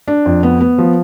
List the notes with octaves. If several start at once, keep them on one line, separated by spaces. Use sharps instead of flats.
D4
F2
B3
B3
F3